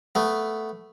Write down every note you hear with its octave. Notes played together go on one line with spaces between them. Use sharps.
A3 B3